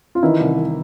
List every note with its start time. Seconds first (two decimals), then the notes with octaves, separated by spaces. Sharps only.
0.15 F4
0.23 D#3 E3 E4
0.40 C2